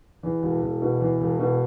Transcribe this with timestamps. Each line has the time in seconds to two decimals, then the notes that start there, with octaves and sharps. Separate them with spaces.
0.23 E2
0.42 E1
0.62 E1
0.82 B2
1.01 E2
1.21 E1
1.39 B2